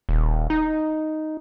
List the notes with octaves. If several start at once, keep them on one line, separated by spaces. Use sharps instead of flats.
D#1
D#4